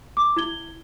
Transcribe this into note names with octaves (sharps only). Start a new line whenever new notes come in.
D6
E4 G#6 G7